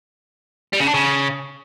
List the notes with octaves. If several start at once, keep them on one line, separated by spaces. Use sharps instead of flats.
G3
C#3
D4
C#3